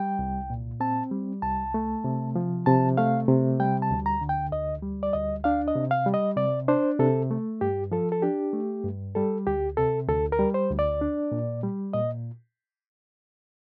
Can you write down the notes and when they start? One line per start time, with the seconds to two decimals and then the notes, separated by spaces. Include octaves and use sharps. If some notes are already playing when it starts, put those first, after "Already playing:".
Already playing: G3 G5
0.19 C2
0.50 A#2
0.80 C4 A5
1.11 G3
1.42 C2 A5
1.74 A3
2.04 C3
2.36 F3
2.66 C3 A5
2.97 A3 F5
3.28 C3
3.60 G3 G5
3.82 A5
3.91 D2
4.06 A#5
4.21 D3
4.29 G5
4.52 D2 D#5
4.83 G3
5.03 D5
5.13 D2 D#5
5.44 D4 F5
5.68 D#5
5.75 C3
5.91 F5
6.06 G3
6.14 D#5
6.37 C3 D5
6.68 D4 C5
6.99 C3 A4
7.31 A3
7.61 G2 G4
7.92 F3 A4
8.12 A4
8.22 D4 G4
8.53 A3
8.84 G2
9.15 G3 A4
9.47 D2 G4
9.77 C3 A4
10.08 D2 A4
10.32 A#4
10.39 G3
10.54 C5
10.71 D2
10.79 D5
11.01 D4
11.32 A#2
11.63 G3
11.93 A#2 D#5